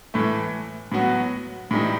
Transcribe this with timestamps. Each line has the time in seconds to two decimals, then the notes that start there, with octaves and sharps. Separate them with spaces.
0.14 A2 E3 A3
0.92 A2 F#3 B3 F#4
1.71 A2 E3 G3 D#4